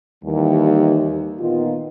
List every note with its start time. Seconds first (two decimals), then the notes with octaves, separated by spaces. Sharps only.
0.24 D#2 E3 G3
1.39 A#2 D#3 B3 D#4 F4